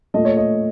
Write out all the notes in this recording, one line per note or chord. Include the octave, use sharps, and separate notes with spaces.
A#2 A3 D#5
C#5
D#5